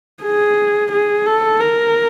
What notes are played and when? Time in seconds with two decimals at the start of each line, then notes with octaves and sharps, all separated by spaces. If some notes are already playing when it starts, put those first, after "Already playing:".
0.23 G#4
0.92 G#4
1.26 A4
1.60 A#4